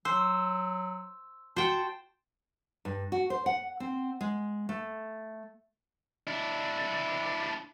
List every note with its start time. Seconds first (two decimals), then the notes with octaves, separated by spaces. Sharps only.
0.05 F#3 C5 E6
1.56 F#4 C5 F#5 G5 A5
2.85 G2
3.12 F#4
3.30 C5
3.46 F#5
3.80 C4
4.21 G#3
4.69 A3
6.27 D4 E4